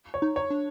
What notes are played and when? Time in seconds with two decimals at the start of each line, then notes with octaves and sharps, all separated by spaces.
0.14 C#5
0.22 D#4
0.36 C#5
0.50 D4